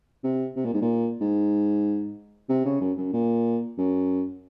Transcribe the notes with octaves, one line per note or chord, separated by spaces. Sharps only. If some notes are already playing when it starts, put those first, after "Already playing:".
C3
C3
A#2
G#2
A#2
G#2
C3
C#3
F#2
F#2
A#2
F#2